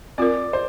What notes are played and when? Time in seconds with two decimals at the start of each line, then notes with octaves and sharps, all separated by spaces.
0.18 C4 F4 A#4 D5
0.53 C5